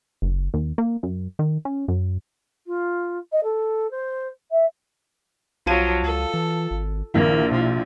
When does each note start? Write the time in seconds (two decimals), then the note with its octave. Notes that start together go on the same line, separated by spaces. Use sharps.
0.22 F#1
0.54 D#2
0.78 A#3
1.03 F#2
1.39 D#3
1.65 C#4
1.88 F#2
2.66 F4
3.32 D#5
3.43 A4
3.90 C5
4.51 E5
5.66 B1 F3 F#3 F4 A5 D#7
6.04 C#2 A4
6.34 E3
6.71 G#1
7.14 A#1 D#3 A#3 E4
7.52 B2 F3